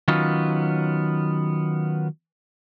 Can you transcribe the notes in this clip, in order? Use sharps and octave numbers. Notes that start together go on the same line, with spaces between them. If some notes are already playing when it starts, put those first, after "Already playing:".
D#3 F#3 B3 C#4 F4